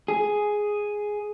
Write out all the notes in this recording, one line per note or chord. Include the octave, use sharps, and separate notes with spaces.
G#4